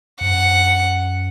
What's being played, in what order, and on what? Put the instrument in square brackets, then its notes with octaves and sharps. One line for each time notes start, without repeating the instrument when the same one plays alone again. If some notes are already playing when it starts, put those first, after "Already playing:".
[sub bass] F#2 [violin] F#5